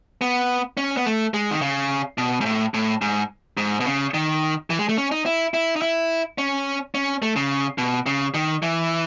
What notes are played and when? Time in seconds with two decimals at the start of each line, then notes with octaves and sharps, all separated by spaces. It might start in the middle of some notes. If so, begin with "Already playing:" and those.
0.21 B3
0.77 C#4
0.97 B3
1.06 A3
1.34 G#3
1.51 D#3
1.61 C#3
2.18 B2
2.41 G#2
2.45 A2
2.74 A2
3.02 G#2
3.57 G#2
3.80 B2
3.86 C#3
4.14 D#3
4.70 E3
4.79 G#3
4.89 A3
4.98 C#4
5.12 D#4
5.26 E4
5.54 E4
5.76 D#4
5.82 E4
6.38 C#4
6.95 C#4
7.22 A3
7.36 C#3
7.78 B2
8.06 C#3
8.34 D#3
8.62 E3